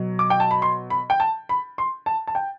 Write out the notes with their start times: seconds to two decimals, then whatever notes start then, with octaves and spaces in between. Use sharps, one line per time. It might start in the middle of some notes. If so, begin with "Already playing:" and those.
Already playing: B2 F#3
0.19 D6
0.30 G5
0.40 A5
0.51 B5
0.62 C6
0.90 B5
1.10 G5
1.20 A5
1.49 B5
1.78 C6
2.06 A5
2.27 A5
2.35 G5